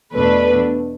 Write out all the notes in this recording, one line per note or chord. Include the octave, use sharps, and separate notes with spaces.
E2 B2 A3 D4 B4